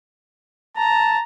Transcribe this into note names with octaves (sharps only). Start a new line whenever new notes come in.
A5 A#5